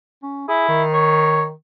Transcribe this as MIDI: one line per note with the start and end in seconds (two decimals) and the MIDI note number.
0.23 0.47 61
0.48 0.83 64
0.48 0.68 68
0.68 1.51 51
0.94 1.44 73